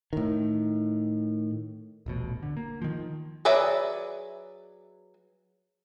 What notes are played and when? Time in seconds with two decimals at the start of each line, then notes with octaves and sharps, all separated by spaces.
0.13 A2 D#3
2.06 D#1 A1 B2
2.43 D3
2.57 A#3
2.82 D#3 F3
3.45 F#3 G#4 B4 D5 E5